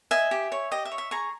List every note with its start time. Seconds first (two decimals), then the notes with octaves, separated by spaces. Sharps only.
0.11 D#5 E5 G#5
0.31 G4
0.52 C#5
0.71 G4 D#5
0.85 E5
0.91 C#5
0.98 E5
1.11 G#4 A#5 C#6